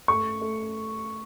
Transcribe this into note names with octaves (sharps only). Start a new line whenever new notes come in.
A3 C#6
A3